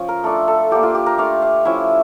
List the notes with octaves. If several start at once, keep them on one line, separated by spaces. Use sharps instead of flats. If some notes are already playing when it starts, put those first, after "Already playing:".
Already playing: F3 C#4
A#4
A3 D4 F4 A4
A4
A#3 D4 F4 G4
F4
G4
A#4
A3 D4 F4 F5
F5
F3 C#4 E4 E5